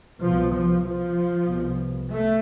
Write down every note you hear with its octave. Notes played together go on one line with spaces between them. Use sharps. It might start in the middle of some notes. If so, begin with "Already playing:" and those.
C2 B2 F3
F3
F3
C2 B2
A3